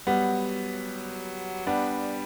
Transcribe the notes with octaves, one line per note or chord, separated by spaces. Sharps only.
F#3 G3 B3
G3 B3 D4